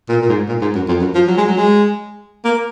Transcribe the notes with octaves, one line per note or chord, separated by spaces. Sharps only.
A#2
A#2
G#2
A#2
G#2
F#2
F2
F#2
F3
F#3
G#3
F#3
G#3
A#3